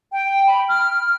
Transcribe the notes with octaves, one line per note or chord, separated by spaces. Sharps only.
G5
B5
F6